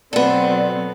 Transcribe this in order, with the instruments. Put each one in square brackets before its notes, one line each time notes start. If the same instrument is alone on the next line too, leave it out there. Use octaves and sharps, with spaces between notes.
[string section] B2 F#3 C4 [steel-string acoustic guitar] B3 A4 [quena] D5